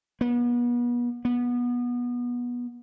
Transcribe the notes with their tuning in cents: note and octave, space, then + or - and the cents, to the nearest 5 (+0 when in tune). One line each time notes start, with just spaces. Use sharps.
B3 -35
B3 -20